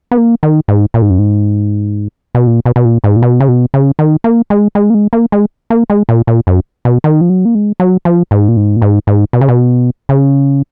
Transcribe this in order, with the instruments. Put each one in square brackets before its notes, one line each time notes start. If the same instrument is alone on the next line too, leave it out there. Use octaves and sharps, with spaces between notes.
[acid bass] B3
A#3
D#3
G#2
A#2
G#2
F#2
G#2
B2
A#2
B2
B2
A#2
G#2
A#2
B2
C#3
B2
C#3
D#3
A#3
G#3
G#3
A#3
G#3
A#3
G#3
A#3
G#3
A#2
A#2
F#2
B2
D#3
F3
F#3
A#3
G#3
F#3
F3
G#2
A#2
G#2
A#2
G#2
G#2
B2
C#3
B2
C#3